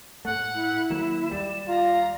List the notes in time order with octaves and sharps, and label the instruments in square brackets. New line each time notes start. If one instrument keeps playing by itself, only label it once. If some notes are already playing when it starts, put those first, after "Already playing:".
[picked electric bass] A2 A3 [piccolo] F#5
[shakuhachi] E4
[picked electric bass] D#3 F#3 A#3 [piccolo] E7
[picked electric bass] D#2 G3 [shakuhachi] D5
[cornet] F4 [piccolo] A#5